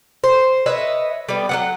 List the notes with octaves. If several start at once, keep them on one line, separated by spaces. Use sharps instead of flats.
C5
B4 C#5 D#5 E5
G3 B3
F#3 B3 F#5